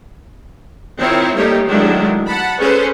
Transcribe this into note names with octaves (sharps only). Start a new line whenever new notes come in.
D#3 C4 E4 F4 C#5
G3 A3 A#3 D#4 G4 C#5
D#3 F#3 G#3 A3 D4 E4
F#5 A5 B5
C#4 G#4 A4 B4 C5